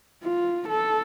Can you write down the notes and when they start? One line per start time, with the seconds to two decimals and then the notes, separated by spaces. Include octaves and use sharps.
0.23 F4
0.69 A4